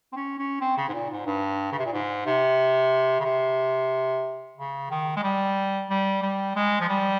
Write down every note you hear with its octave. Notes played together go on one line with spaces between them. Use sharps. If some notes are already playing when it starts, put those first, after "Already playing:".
C4
C#4
C#4
C4
C#3
G#2
A#2
G#2
G2
C#3
C3
A#2
G#2
C3
C#3
C3
C#3
D#3
G#3
G3
G3
G3
G#3
F3
G3